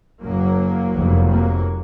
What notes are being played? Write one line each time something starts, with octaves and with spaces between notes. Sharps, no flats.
F#1 F#2 F#3 A#3
F1 F2
F#3 A#3